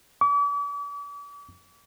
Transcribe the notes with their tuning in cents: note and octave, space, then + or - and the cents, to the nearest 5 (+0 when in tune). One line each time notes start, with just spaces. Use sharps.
D6 -40